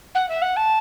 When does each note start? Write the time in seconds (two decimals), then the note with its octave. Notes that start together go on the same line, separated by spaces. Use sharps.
0.15 F#5
0.29 E5
0.42 F#5
0.56 A5